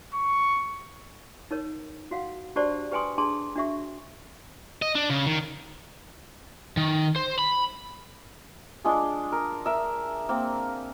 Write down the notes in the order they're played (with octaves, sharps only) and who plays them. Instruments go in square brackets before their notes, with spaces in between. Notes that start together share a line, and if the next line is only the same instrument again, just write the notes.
[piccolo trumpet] C#6
[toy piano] D#4 A#4 C#5
F#4 F5 F#5
D4 F#4 G4 C5 D5 A5
G4 B4 G5 G#5 C6 D#6
D4 G#4 A5 C6
D4 F#4 E5 C#6
[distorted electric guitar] D#5
D4
C#3
D#3
[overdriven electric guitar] D#3
C5
B5
[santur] G#3 D4 F4 G#4
A#4
A#4 E5
A#3 C4